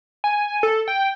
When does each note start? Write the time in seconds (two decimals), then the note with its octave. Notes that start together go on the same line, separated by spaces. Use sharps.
0.24 G#5
0.63 A4
0.88 G5